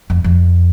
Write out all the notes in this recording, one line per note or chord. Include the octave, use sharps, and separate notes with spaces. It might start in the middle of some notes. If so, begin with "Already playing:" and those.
F2
F2